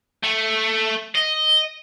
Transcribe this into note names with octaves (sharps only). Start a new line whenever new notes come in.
A3
D#5